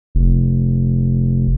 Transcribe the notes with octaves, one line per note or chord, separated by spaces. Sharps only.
F1